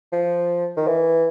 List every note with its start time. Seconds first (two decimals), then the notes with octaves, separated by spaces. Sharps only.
0.12 F3
0.77 D#3
0.88 E3